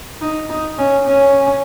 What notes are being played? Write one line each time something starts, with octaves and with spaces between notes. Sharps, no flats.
D#4
D#4
C#4
C#4